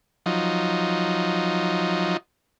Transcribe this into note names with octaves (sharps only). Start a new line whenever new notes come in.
F3 F#3 D#4